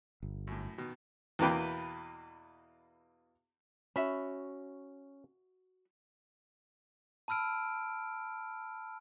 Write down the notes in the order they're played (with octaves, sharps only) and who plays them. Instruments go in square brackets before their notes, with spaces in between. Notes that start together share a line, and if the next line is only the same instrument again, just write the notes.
[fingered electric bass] G1
[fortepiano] F#2 A2
B2 D#3
E2 B2 E3 A#3 B4 G5
[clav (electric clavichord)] C#4 [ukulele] F#4 E5 B5
[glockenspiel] A5 B5 E6 F6 D7